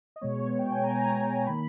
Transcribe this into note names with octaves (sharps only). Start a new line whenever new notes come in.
D#5
B2 G#3 B3 C#5
G5
G#5
A#5
D#3 A#3 B5